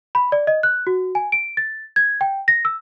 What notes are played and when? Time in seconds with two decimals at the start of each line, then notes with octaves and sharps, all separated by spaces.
0.15 B5
0.32 D5
0.47 D#5
0.63 F#6
0.87 F#4
1.15 G#5
1.32 D7
1.57 A6
1.96 G#6
2.21 G5
2.48 A#6
2.65 E6